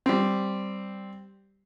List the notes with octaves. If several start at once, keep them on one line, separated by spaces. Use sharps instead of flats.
G3 C4